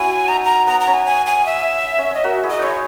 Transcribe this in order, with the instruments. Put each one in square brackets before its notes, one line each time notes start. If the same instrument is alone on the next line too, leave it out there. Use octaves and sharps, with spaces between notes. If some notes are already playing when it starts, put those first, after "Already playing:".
Already playing: [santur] C#4 E4 F#4 [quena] G#5
[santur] D#4 [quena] A#5
[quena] A#5
[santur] B3 [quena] A#5
[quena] A#5
[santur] C#4
[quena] G#5
G#5
G#5
E5
[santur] C#4
[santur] C#4 [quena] D#5
[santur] F#4 A#4 [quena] E5
[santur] E4 G#4
[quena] D#5
[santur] D#4 E4 [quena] C#5